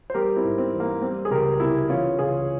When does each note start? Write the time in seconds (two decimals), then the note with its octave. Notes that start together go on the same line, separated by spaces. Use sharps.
0.10 C5
0.14 G3 G4 A#4
0.36 C4 E4
0.44 G#2
0.58 C4
0.73 E3
0.80 A#3
1.02 G3 C4
1.25 G#4
1.31 C#2 G4 A#4
1.60 C3 E4 G4
1.89 E3 C#4 F4
2.18 C#2 F4 G#4